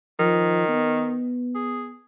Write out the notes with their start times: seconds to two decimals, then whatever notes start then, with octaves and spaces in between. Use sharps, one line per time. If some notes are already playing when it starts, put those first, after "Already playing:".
0.19 D#3 F3
0.68 B3
1.55 G#4